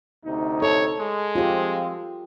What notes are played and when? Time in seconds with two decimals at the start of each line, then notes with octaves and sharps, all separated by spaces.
0.25 D2 C3 D#4
0.62 A4 C#5
0.99 G#3
1.35 F3 C4 F4 G4